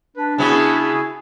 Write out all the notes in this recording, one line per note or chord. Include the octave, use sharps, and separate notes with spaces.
D4 B4
C#3 B3 E4 F#4 G#4